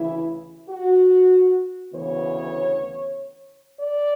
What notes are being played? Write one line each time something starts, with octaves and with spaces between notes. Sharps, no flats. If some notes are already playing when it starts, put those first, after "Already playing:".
Already playing: D2 C#3 E3 E4
F#4
D2 C#3 E3 B3 C#5
D5